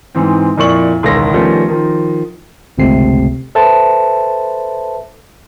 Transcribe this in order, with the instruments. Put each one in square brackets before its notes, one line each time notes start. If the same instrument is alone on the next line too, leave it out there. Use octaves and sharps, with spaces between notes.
[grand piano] G#2 E3 C4
F2 A#2 E4 D5 C#6 F#7
E1 C#2 D#3 C#5 A#6
D#3 F3 G3 A3 B3 C#4
D#3 F3
[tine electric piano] G1 C#2 C3 A3 C4 C7
A4 B4 C5 E5 A5